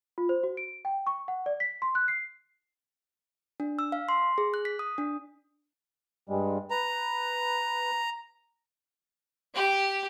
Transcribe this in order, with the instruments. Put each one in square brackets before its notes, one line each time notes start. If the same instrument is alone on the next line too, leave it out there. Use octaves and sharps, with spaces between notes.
[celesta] F4
C5
F#4
D7
G5
C#6
F#5
D5
B6
C6
F#6
C7
[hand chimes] D4
E6
F5
C6
G#4
F#6
B6
D#6
D4
[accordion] G2 G3 G#3
[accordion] B4 [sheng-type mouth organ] A#5
[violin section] G4